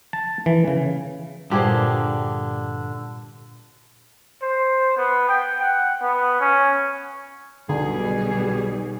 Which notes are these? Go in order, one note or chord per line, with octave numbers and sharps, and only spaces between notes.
A5
E3
C#3
G2 A#2 D3 G4 G#4 C5 A#5 D6
C5
B3
G5
F#5
B3
C#4
B1 B2 D3 G3 G#4